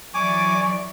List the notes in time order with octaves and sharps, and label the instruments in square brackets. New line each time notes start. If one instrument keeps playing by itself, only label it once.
[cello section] E3 F#3 D5 [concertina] G#5 D6 [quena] C#6